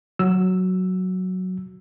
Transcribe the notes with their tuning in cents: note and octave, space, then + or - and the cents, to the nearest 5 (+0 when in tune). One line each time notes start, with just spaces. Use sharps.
F#3 +0 E6 +0